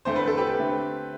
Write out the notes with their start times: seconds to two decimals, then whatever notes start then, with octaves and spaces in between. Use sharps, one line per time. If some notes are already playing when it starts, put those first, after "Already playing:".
0.05 E2 D3 A3 C4 C5
0.16 B4
0.27 A4
0.37 G4 B4
0.58 D3 A3 C4